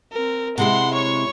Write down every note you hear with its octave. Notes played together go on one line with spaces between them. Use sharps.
C4 A#4
C3 G#3 E4 F#5 C6
C#5 C#6